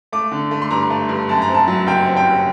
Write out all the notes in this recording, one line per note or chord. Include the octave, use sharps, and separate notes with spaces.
A3 D6
D3
A3
C6
G2 A#5
A3
G2
F#2 A5
A#5
C4
A5
F#3
F#1 G5
C4
G5
F#1